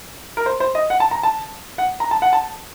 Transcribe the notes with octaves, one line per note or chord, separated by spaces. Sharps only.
A#4
C5
C5
D#5
F#5
A5
A#5
A5
F#5
A#5
A5
F#5
A5